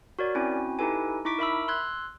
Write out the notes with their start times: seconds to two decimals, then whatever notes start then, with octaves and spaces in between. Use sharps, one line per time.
0.19 F#4 A#4 C#5 D5
0.35 C4 C#4 E4 F#4 G#5
0.79 D#4 E4 G4 A4 B4 G#5
1.25 D#4 E4 C#6 D6 B6 D7
1.38 A#4 E5 B5 E6
1.68 C6 E6 F#6 G#6